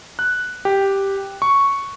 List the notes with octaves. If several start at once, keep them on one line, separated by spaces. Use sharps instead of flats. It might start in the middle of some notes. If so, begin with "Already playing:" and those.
F#6
G4
C#6